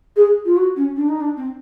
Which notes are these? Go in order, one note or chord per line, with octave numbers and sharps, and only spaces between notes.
G#4
F4
F#4
C#4
D4
D#4
D4
C4